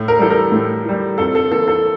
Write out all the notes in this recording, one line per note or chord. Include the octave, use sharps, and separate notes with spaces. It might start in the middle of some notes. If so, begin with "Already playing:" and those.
Already playing: A2
A#4
E3 G3 A4
A#4
A2
E3 G3
F2 A4
A4
E3 A#3 A4
A4